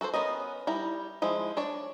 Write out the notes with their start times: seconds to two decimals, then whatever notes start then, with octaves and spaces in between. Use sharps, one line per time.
0.01 F#4 A4 A#4 C5
0.14 B3 C#4 A#4 D#5
0.67 G3 E4 A#5
1.22 F3 G#3 E4
1.57 D4 C#5 D5